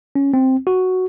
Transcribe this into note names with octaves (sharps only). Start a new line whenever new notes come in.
C#4
C4
F#4